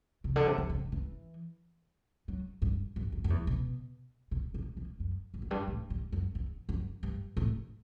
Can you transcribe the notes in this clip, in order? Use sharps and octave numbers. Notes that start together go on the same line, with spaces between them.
C3
D3
C3
D3
C3
D3
E3
F#3
G2
G2
F#2
F#2
E2
B2
B2
B2
B2
F#2
G2
F#2
G2
A2
G2
F#2
E2
F#2
G2
A2